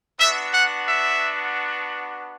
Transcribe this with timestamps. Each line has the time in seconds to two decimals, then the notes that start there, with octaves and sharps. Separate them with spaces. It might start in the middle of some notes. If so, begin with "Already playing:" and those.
0.18 B3 D4 F#4 E5
0.53 F#5
0.88 E5